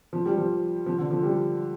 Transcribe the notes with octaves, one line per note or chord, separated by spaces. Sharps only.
F3
G3
F3
F3
D3
F3
G3